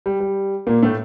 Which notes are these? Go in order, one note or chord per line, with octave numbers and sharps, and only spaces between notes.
G3
G3
A#2 A#3
A2 A3